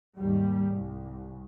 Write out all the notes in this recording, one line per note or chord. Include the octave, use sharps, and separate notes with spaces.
D#2 G#2 G3
C2